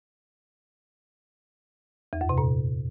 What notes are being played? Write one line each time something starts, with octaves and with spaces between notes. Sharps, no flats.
E2
F#2
C3
A#2